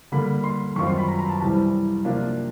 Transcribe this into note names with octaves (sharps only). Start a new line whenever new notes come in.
D3 G3 A#3 B5
C6
F#2 D#3 G3 C4 F4 C#6
C6
B5
A#5
A#5
A5
C2 C3 E3 G3 C4 A5
C3 F3 A#3 D4 F4